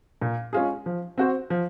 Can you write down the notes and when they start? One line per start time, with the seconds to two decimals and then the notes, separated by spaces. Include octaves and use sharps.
0.22 A#2
0.53 G#3 C#4 F4 G#4
0.86 F3
1.18 C4 F#4 C5
1.50 F3